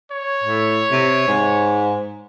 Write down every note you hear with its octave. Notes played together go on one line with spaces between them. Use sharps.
C#5
A2
C3
G#2